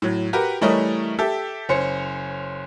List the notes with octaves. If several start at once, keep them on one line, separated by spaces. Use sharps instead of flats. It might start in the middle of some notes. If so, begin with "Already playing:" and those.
A2 F#3
F#4 G4 A#4 B4
E3 G3 A3 A#4 C#5 D#5
G4 A4 E5
F#1 C#4 C5 C#7